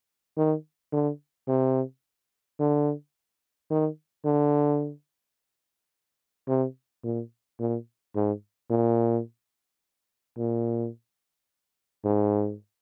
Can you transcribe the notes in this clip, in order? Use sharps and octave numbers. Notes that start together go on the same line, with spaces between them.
D#3
D3
C3
D3
D#3
D3
C3
A#2
A#2
G#2
A#2
A#2
G#2